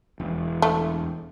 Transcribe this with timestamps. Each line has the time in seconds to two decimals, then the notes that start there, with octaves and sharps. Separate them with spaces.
0.20 E1
0.62 A3